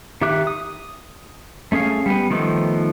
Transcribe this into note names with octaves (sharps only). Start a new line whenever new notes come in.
D#3 G4 E5 D6 F#6
D#6
A3 C#4 G#4 F5
G3 B3
D#3 F3 A3 B3 D#4